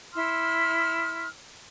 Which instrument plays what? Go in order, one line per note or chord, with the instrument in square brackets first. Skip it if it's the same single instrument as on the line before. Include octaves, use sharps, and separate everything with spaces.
[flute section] E4 C6 E6 F6